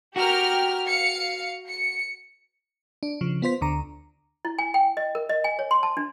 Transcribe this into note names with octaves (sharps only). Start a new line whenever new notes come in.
F#4 G4 A#4 F6
F5 C#7
C#7
D4
C#3 F3
B3 F4 C5 B6
D2 D3 A#5
E4
G#5
G5
D#5
A#4
D#5
G#5
C#5
C6
A5
D4